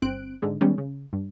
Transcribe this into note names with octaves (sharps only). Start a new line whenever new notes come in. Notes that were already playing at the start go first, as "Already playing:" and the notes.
G1 C4 F#6 D7
G#2 D3 G#3
D#3 G3 G#3 B3 C#4
C#3
G2